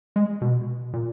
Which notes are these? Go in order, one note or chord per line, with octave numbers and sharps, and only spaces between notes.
G#3
B2
A#2